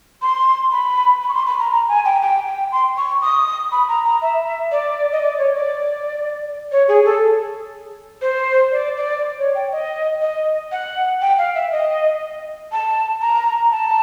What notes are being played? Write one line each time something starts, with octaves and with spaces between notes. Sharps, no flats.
C6
B5
B5
C#6
C6
B5
A#5
A#5
G#5
G5
G5
G5
C6
C#6
D#6
B5
A#5
A#5
E5
D5
D#5
D5
C#5
D5
C#5
G#4
A4
C5
D5
D5
C#5
G5
D#5
D#5
F#5
G5
F5
E5
D#5
A5
A#5
A5